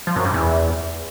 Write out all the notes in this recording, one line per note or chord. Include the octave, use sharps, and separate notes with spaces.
F3
F#2
G2
E2